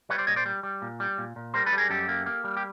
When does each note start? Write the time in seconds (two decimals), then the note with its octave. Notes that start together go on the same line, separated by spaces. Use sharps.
0.09 G3 B4 C#5
0.18 C5 D5
0.27 A#2 C#5 D#5
0.36 C5 D5
0.46 G3
0.63 G3
0.82 A#2
1.00 G3
1.18 A#2
1.36 A#2
1.54 G3 A#4 C5
1.66 A4 B4
1.73 G3
1.78 G#4 A#4
1.90 F#2 G4 A4
2.08 A#3
2.26 A#3
2.44 G3
2.57 G4